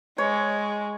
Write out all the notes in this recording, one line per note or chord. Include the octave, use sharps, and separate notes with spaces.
G#3 C#5